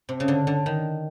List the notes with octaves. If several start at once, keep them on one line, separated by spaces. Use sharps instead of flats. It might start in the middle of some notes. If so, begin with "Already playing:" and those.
C3
C#3
D3
D3
D#3